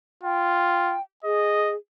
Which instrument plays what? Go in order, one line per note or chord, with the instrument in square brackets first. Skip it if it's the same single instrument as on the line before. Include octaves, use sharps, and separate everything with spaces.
[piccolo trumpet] F4 [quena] G5
[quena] G#4 [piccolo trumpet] D#5